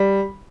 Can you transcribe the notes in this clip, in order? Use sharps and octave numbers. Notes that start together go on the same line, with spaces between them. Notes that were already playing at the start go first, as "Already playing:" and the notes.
Already playing: G3